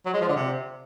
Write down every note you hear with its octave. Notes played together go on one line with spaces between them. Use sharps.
F#3
G#3
F3
D3
C3